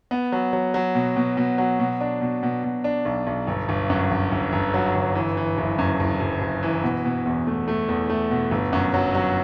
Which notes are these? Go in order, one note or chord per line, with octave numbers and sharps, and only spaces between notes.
B3
F#3
F#3
F#3
B2
B2
B2
F#3
B2
D4
B2
B2
B2
D4
B1
B1
G1
G1
F#2
G1
G1
G1
F#3
G1
E3
E3
F#1
F#2
F#1
F#1
F#1
E3
B2
B2
E2
A3
A3
E2
A3
B2
G1
F#2
F#3
F#3